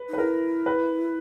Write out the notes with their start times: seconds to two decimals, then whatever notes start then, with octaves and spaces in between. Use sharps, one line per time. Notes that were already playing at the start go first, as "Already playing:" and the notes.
Already playing: B4
0.09 D#4
0.13 B4
0.18 E4 A#4
0.66 B4